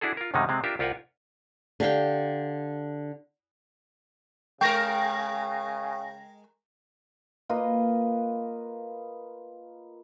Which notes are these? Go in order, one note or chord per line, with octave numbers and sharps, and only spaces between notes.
D4 E4 F#4 G#4 A4
F4 A#4
F#2 C3 D#3 G3 G#3 D#4
C3 G#3 C4
D4 F4 G4 A#4 E5
C2 F4 G4 A#4 F#5 G#5
D3 G4 F5 G5
C#3 G#3 A#4 G5 A#6
A#3 F4 B4 D#5